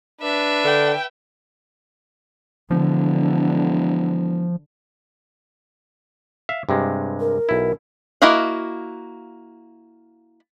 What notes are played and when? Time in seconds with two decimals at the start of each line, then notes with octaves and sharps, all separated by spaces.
0.21 D4 B4 E5
0.64 D3 G5
2.71 E1 D3 F3
6.49 E5 F5
6.69 G2 C3 G#3
7.20 A#4
7.49 B1 E4
8.22 A#3 E4 F#4 D#5 F5